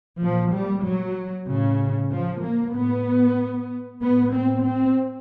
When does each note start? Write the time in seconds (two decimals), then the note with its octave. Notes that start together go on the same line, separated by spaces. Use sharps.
0.20 A#2 F3
0.52 G3
0.84 F#3
1.47 A2 C#3
2.11 F3
2.42 A#3
2.74 A2 B3
4.02 A2 B3
4.34 C4
4.65 C4